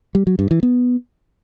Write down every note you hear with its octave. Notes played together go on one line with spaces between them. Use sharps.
G3
F#3
G2
E3
B3